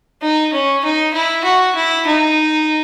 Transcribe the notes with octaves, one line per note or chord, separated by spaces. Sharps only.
D#4
C#4
D#4
E4
F#4
E4
D#4